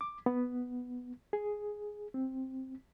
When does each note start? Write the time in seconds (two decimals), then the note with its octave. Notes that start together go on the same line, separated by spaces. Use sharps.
0.01 D6
0.26 B3
1.33 G#4
2.14 C4